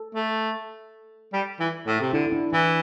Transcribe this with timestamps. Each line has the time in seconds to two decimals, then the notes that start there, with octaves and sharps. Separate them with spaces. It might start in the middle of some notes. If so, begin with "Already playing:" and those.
Already playing: A4
0.15 A3
1.33 G3
1.60 E3
1.87 A2
2.01 C3
2.13 D3 E4
2.26 E4
2.32 D4
2.53 E3 E4